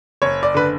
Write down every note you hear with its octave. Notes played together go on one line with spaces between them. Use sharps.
F#1 C#5
D5
D3 B4